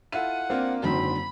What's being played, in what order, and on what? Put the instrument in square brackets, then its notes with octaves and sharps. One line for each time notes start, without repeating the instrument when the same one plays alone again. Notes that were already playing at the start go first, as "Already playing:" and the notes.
[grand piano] E4 F4 A4 [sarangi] F#5 [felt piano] D#7
[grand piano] A#3 D4 F4 [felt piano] C4
[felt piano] F#1 D3 F#3 [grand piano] G#2 C4 [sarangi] B5